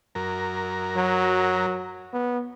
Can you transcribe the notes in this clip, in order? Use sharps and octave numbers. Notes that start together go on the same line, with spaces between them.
F#2 A#4
F#3
B3